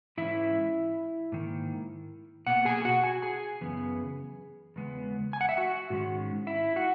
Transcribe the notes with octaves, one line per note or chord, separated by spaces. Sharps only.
G#2 E3 G#3 C#4 E4 E5
G#2 D#3 A#3
B2 A#3 F#5
G#4 G#5
F#4 F#5
G#5
G#4 G#5
F#2 C#3 E3 B3
E2 C#3 G#3 B3
G#5
F#5
E5
F#4 F#5
G#2 D#3 G#3 C#4
E4 E5
F#4 F#5